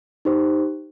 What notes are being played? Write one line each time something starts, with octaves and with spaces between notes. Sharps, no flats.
D#4 G4 C5